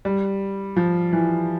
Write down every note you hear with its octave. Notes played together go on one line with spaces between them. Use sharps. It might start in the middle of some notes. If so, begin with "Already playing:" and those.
G3
F3
E3